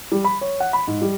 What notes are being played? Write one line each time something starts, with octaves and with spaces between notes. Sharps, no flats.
G3
B5
C#5
F#5
B5
G#2
G3